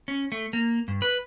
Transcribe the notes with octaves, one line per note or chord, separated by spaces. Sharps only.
C#4
A3
A#3
G2
B4